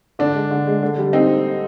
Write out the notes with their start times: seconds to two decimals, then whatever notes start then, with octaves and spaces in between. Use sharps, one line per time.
0.19 D3 D4
0.35 G#3
0.51 D3
0.67 G#3
0.83 D3
0.98 G3
1.13 C4 D#4